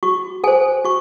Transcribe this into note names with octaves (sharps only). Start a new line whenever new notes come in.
F#4 C#6
A4 C5 G#5
F#4 C#6